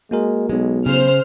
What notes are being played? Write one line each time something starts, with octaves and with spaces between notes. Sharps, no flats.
G#3 A#3 F#4 A#4
B1 F#3 G#3 B3
C#3 C5 F6